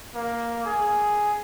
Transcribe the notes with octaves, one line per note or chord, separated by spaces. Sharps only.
A#3
G#4